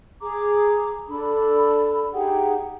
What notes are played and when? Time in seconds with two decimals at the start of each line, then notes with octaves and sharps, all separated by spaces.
0.21 G#4 A#5 D6
1.08 D4 A4 B5
2.13 D#4 G4 G#4 F#5